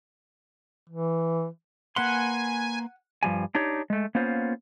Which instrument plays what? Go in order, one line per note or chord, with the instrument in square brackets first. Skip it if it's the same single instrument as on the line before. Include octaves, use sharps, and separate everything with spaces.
[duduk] E3
[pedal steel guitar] A#3 B4 C6 [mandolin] F#5 [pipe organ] G#5
[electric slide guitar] G2 F3 G3 G#5
D4 D#4 G4 C#5
G#3 A3
A#3 B3 C#4 F4 C5